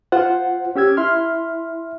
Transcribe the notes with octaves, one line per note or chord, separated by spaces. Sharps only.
F4 C5 F#5
C#4 G4 E6 G#6
E4 E5 C6 F6